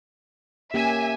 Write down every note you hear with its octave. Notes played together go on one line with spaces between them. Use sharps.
A#3 C#4 G4 E5 G#5